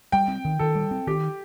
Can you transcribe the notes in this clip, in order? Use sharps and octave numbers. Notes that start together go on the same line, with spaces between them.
G3 G5
C4
D#3
D#3 A4
G3
C4
D#3 G4